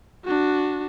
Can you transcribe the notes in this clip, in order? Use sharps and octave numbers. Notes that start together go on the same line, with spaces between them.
D4 F#4